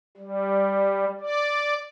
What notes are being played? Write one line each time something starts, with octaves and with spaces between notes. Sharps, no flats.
G3
D5